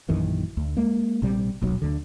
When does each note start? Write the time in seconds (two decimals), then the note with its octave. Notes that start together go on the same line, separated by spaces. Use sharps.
0.09 A#1 F#2 D#3 E3
0.57 D2
0.77 G#3 A#3
1.22 A#1 C3 G3
1.62 D#1 B1 F#3
1.82 D2 D3